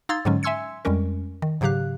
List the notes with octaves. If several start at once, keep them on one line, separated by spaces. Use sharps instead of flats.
D#4 F5 C6 E6 G#6 A6
G#2 D3 F#3 G#3 C#4
E5 G#5 C6 E6 G#6 C#7
F2 G3 G#3 C#4 A#4
D#3
G#2 C#3 F#3 G4 F5 F#6